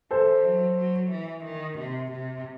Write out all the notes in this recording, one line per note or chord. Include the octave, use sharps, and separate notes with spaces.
E3 A4 C5
F#3
F#3
E3
D#3
C3
C3